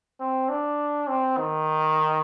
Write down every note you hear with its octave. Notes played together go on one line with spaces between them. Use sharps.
C4
D4
C4
D#3